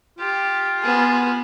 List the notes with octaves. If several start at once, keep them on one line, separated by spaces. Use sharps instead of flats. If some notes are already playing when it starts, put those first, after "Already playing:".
F4 G4
B3 G#4